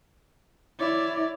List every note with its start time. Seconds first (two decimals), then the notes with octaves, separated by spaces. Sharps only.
0.79 E4 C#5 D5